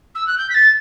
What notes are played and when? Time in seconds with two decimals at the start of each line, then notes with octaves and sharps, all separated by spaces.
0.14 E6
0.26 F#6
0.38 G6
0.49 B6
0.54 A6